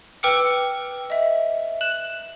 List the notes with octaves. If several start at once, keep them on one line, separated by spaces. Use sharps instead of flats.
B4 G5 D6 E6 F6 C#7
D#5 E5
F#6 E7 F#7